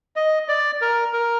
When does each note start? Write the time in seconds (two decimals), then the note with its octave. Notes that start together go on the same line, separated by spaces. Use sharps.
0.16 D#5
0.48 D5
0.81 A#4
1.13 A#4